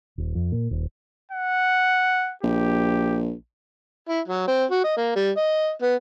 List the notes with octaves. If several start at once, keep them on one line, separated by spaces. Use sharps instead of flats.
D#1
F2
A#2
D#1
F#5
A#1 G4
E4
F#3
C4
F#4
D#5
A#3
G3
D#5
B3